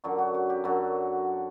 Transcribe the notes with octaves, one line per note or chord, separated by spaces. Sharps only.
F#2 D3 F#3 F#4
F#4
F#4
G4
F#2 D3 F#3 F#4